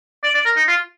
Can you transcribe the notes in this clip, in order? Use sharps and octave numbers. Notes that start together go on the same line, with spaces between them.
D5
D5
A#4
D#4
F4